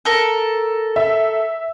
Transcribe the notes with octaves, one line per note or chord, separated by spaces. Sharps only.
A4 A#4
E5